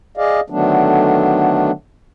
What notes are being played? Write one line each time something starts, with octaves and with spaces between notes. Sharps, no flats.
G#4 D5 D#5 F5
D3 D#3 F#3 A3 B3 D4